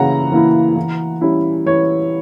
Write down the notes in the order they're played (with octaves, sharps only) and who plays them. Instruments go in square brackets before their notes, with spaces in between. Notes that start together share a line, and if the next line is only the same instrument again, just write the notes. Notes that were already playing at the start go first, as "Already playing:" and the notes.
Already playing: [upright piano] C#3 E3 A#3 E4 F#5 A#5
E3 A#3 E4
E3
G3 C#4 E4
E3 C#5